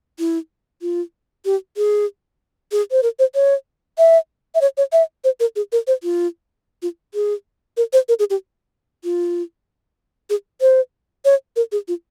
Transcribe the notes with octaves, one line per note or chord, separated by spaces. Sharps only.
E4
F4
G4
G#4
G#4
C5
A#4
C5
C#5
E5
E5
C#5
C#5
E5
C5
A#4
G#4
A#4
C5
F4
F4
G#4
A#4
C5
A#4
G#4
G4
F4
G#4
C5
C#5
A#4
G#4
F4